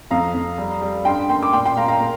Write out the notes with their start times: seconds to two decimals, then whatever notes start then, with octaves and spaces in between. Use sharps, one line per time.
0.11 F2 F5 A#5
0.34 F2
0.58 G3
0.81 G3
1.05 G2 G5 C6
1.29 A#3 G5 C6
1.43 D6
1.52 A#2 G5 C6
1.65 G5 C6
1.76 A#2 F5 A#5
1.88 F5 A#5
2.00 A#3